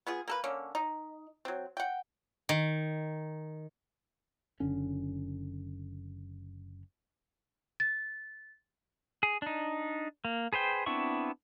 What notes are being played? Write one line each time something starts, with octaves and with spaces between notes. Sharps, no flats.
B3 F4 G#4
A#3 A4 B4
D3 A#3 C#4
D#4
F#3 C4
F#5 G5
D#3
F#1 D3 C#4
A6
G#4
D4 D#4
A#3
G#4 B4 C5 G5
B3 C4 D4 E4 C#6